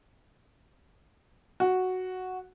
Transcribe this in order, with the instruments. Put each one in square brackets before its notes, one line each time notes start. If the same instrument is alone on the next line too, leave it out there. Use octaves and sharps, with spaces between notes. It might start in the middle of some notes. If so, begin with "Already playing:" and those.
[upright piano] F#4